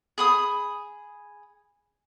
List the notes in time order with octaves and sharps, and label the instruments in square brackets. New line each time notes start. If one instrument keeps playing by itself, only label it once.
[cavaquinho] G#4 B5 D#6